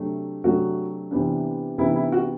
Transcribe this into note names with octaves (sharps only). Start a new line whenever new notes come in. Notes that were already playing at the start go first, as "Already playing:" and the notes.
Already playing: C3 F#3 A3 D4
C3 F#3 A3 D4 F#4
C3 E3 B3 D4
C3 E3 B3 D4 E4
E4
F#4